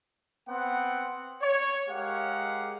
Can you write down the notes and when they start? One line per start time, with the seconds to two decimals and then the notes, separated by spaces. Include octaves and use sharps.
0.49 B3 C4 F#5
1.42 C#5
1.88 G#3 G4 A#4 F5 F#5